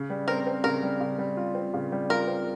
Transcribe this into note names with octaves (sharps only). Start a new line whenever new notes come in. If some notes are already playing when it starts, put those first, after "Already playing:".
Already playing: C#3
G3
C4 A#4
C4
C#3 A#4
G3
C#3
G3
F4
C4
C#3
G3
F4 A#4
C4